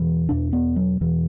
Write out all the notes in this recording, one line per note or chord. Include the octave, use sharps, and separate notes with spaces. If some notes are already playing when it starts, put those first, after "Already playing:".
Already playing: E2 B2 E3
E2 B2 D4
B3
F#3
E2 B2 E3